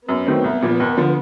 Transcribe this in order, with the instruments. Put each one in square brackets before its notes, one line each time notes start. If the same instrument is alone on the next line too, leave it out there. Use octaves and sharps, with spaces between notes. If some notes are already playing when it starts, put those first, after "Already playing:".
[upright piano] F#2 [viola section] B3
[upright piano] D#3 F#3 A3 C4
C2
A#2 F3
D#2
D3 F3